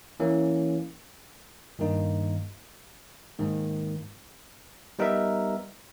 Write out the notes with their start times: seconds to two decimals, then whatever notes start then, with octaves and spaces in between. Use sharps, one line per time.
0.20 E3 A#3 C#4
1.79 G2 D#3 A#3 D#4
3.39 G#2 D#3 A#3
4.99 G3 B3 D#4 A#4 E5